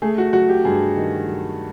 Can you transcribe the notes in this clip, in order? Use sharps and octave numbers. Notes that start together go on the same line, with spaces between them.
A3 G#4
F#4
F#3 F#4
G4
G2 G#4
D#3
F#3